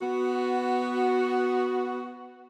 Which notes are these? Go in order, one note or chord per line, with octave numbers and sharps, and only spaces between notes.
B3 F#4